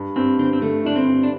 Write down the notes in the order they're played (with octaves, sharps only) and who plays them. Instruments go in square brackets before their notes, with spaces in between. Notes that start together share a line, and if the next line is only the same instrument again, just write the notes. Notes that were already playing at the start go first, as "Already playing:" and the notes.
Already playing: [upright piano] G2
[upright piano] G2 [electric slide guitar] C4
[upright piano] D3 [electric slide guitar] C4
[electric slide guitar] C4
[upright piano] D3 [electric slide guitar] A3
[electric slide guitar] D4 [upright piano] E4
[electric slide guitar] C4
[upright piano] G2
[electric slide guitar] D4